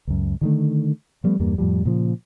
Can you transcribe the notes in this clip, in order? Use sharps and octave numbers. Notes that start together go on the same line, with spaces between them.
C#2 F#2
D3 D#3 A3
F3 G3 A3 B3
E2 G2 G3 A#3
F2 A2 F3 G3
A#2 C#3 F3